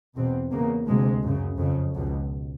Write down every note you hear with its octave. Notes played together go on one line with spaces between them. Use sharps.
E2 B2 C4
E2 C#3 A#3
D2 C3 G#3
F#2 C#3
F2 C#3
C#2 B2